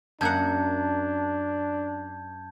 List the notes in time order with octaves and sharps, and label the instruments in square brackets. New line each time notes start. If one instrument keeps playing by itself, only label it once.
[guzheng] F#2 A#3 F#5 [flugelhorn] D4 [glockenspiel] A5 G6 G#6